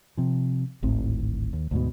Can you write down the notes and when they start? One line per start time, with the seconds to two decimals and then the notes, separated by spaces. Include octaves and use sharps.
0.17 C3 F3
0.82 D1 G#1 A2 C4
1.53 D#2
1.71 D2 G#2 B2